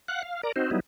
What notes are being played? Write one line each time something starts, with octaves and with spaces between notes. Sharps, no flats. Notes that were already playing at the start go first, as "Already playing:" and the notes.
F5 F#5 F#6
F5
A#4 D5 A#5
C4 D#4 F#4 C5
F#3 G3 B3 D#4 E4